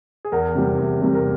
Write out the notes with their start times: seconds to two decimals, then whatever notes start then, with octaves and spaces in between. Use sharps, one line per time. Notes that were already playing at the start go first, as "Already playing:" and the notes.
0.25 G#4
0.32 E2 A#4
0.55 C3 G3
0.78 E2
1.01 C3 G3
1.14 A#4